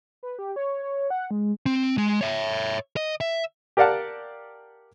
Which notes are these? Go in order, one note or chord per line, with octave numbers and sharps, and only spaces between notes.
B4
G4
C#5
C#5
F#5
G#3
C4
G#3
C#5 E5
D#5
E5
G4 A#4 D5 F5 F#5 A5